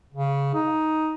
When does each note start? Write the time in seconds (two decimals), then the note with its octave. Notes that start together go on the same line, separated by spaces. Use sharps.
0.14 C#3
0.54 D#4